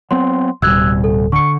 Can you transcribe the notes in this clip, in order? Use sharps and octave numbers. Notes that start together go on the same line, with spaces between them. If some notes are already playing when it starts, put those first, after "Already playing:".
F#3 B3 C4 C6
D1 B2 G3 E6 F#6 G#6
A4
D3 C#6 C#7